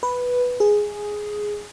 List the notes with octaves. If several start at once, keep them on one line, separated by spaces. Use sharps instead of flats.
B4
G#4